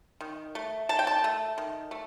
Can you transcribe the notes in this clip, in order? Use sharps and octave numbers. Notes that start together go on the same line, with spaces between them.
D#3
A3
D#3 A5
G5
A5
A3
D#3
A3